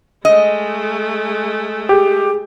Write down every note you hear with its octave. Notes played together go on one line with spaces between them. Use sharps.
G#3 A3 D#5
G4 G#4